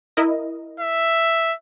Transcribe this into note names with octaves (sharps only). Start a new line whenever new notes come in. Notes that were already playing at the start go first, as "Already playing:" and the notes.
E4 A#4 D#5
E5